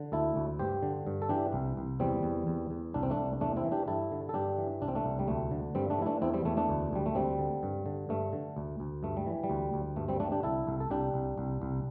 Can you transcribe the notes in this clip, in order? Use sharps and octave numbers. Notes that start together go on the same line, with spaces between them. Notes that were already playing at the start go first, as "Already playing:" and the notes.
Already playing: D3
D2 E4 A4
D2
G2 G4 C5
D3
G2
A4
E3 D4 G4
C2
C2
E2 G3 C4
E2
E2
E2
C2 D4
C4
A3 D4
C2
E2 A3 D4
C4 E4
E3
D4 G4
G2 E4 A4
D3
A4
G2 D4 G4
E3
C2 D4
C4
A3 D4
C2
G3
D2 A3
D3
G2 G3 C4
A3 D4
E3 E4
A3 D4
E2 C4 E4
G3 C4
E2 A3
A3 D4
D2
D2 G3
A3
D2 G3 C4
D3
G2
D3
G2 A3
D3
D2
D2
G2 A3
G3
E3
G3
D2
D2
G2 A3
G3 C4
D3 A3 D4
D4 G4
C2 E4 A4
C2
A4
C2 D4 G4
C2
C2
C2